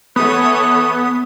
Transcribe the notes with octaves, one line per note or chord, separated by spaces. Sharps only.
E3 B3 A4 C#5 D#6